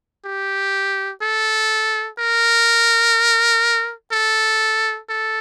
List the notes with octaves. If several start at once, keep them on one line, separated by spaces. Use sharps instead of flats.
G4
A4
A#4
A4
A4